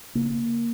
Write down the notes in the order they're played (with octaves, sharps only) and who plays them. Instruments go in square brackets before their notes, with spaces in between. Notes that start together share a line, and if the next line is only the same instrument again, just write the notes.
[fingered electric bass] C#3 A#3